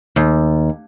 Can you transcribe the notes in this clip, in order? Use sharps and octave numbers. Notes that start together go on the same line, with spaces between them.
D#2